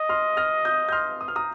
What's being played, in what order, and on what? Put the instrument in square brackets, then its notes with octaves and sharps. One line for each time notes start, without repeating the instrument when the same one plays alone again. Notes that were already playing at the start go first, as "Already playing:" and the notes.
Already playing: [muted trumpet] D#5 [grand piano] D#6
[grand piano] C6 F6
F6 A#6
D#6 G6
G6
C6 F6
D#6
F6
A#5 D#6